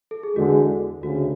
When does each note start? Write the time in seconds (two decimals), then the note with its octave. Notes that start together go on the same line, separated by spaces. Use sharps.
0.11 A4
0.23 G#4
0.36 E2 D3 G#3 F#4
1.02 D2 C#3 F#4